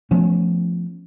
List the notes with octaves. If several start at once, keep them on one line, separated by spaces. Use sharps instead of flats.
F3 A3 B3 C#4